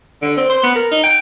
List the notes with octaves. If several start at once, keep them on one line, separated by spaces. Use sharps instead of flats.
D3
C4
C5
B3
A#4
D#4
G5